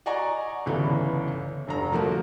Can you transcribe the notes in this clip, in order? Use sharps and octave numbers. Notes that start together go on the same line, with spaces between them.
D5 D#5 F#5 G#5 A#5 C#6
G1 C#2 E3 B3 D5
F1 G2 A#5
D3 F3 A3 A#3 F#4